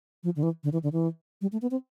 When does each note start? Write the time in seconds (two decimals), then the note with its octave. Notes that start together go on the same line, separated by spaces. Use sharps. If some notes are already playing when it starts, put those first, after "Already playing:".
0.24 F3
0.36 D3
0.43 E3
0.64 D3
0.73 E3
0.83 D3
0.93 E3
1.42 G3
1.52 A3
1.62 B3
1.71 C4